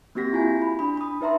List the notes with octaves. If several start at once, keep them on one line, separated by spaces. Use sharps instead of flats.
A#3 C4 F#4 G4 A#6 B6
E4 F4 G#5
B5
D4 B5
B5 D#6
D#4 B4 E5 A#5 C6